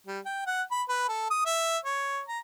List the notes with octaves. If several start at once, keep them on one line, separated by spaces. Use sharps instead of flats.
G3
G5
F#5
B5
B4
A4
D#6
E5
C#5
A#5